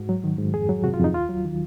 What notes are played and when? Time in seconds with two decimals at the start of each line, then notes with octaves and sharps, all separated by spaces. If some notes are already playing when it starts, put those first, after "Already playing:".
Already playing: G#2 F#4
0.09 F#3
0.24 D#3
0.38 G#2
0.54 F2 G#4
0.69 F#3
0.84 C3 F#4
0.94 F4
0.99 F2 D#4
1.14 D#2 F4
1.29 F#3
1.45 D#3